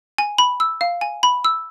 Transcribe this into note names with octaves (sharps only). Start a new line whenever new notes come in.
G#5
B5
E6
F5
G#5
B5
E6